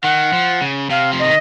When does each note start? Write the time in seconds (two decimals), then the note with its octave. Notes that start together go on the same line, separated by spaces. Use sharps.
0.03 D#3 F#5
0.33 F3
0.61 C#3
0.90 C3 F5
1.13 F3
1.19 D#3 D#5